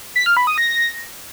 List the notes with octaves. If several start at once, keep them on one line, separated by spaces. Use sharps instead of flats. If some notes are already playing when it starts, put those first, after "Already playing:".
B6
F6
B5
D#6
A#6